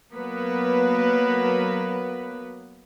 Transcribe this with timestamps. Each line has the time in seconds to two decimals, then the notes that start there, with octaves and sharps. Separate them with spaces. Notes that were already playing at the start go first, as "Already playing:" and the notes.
0.14 F#3 A#3 B3 B4